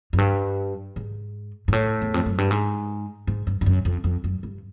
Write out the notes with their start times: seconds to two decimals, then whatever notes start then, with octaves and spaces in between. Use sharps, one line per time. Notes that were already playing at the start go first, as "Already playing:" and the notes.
0.13 F#2
0.18 G2
0.96 G#2
1.68 G#2
1.73 A2
2.02 E2
2.14 F2
2.26 F#2
2.38 G2
2.51 G#2
3.27 G#2
3.47 G2
3.61 G2
3.66 F#2
3.85 F2
4.04 F2
4.24 F#2
4.43 G2